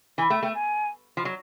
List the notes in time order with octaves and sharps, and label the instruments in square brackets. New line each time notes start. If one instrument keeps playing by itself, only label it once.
[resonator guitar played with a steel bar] E3 [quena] G#5
[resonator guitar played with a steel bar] A3 [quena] G5
[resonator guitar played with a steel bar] A3 [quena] G5
[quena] G#5
[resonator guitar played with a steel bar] F3
F#3